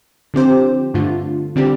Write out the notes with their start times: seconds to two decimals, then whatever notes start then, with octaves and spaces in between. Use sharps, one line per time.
0.34 D3 F3 C4 G4 C5
0.94 G2 D3 A3 F4
1.56 D3 G3 C4 G4